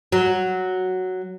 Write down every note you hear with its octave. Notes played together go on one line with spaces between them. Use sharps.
F#3